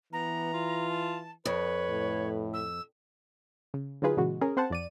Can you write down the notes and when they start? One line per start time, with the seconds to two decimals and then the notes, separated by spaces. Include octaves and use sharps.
0.13 E3 B3 A#5
0.53 F4
0.89 A5
1.45 F2 B4 C#5
1.89 A2
2.54 E6
3.74 C#3
4.02 D3 F#3 D#4 F4 G#4 B4
4.17 A#2 C#3 E3 G#3 F#4
4.41 C#4 G#4 A#4
4.57 C4 C5 F#5 A5
4.70 F2 D5 D#7